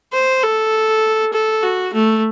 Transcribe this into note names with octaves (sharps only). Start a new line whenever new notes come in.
C5
A4
A4
F#4
A3